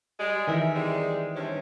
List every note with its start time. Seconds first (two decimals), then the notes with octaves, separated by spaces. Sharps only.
0.19 G3 G#3
0.47 D#3 E3 G#4 A#4 E5
0.75 C3 G3 G#3
1.35 G2 C3 C#4